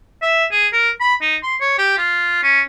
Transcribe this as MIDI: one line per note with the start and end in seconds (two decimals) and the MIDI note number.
0.22 0.45 76
0.52 0.67 68
0.73 0.90 70
1.01 1.14 83
1.22 1.36 63
1.43 1.56 84
1.61 1.76 73
1.78 1.94 67
1.98 2.40 65
2.43 2.61 61